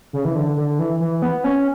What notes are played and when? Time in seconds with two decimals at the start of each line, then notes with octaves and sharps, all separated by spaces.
0.13 C#3
0.25 E3
0.35 D3
0.57 D3
0.79 E3
1.00 E3
1.22 B3
1.44 C#4